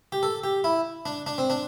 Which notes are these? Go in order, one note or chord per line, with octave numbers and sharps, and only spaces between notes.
G4
A4
G4
E4
D4
D4
C4
D4